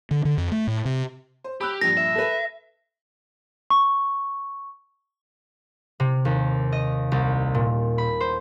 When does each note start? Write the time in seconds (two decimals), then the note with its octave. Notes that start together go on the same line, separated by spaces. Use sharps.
0.11 D3
0.25 D3
0.38 F2
0.52 A3
0.67 A2
0.85 C3
1.44 C5
1.61 G4 B5 E6 F#6
1.81 A#1 G2 A#6
1.97 E5
2.15 A4 B4
3.70 C#6
6.00 C3
6.25 D#2
6.72 D#5
7.12 C2
7.54 A#2
7.98 B5
8.20 C5